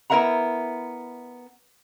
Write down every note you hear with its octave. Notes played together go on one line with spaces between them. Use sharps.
B3 E4 A#4 E5 F#5 A#5